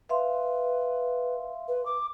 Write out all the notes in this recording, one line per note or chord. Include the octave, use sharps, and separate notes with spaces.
B4 E5 F5 C6
B4
D6